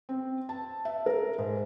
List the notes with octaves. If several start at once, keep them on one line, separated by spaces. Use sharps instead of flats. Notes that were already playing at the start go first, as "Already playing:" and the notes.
C4
A5
E5
A#4
G#2